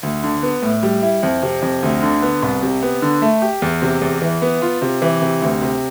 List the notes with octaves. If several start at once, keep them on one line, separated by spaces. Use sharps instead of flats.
D2
D3
B3
A2
G3
E4
F2
C3
F2
D2
D3
B3
C2
C3
B3
D3
A3
G4
E2
C3
E2
E3
B3
F4
C3
E3
C3
D2
C3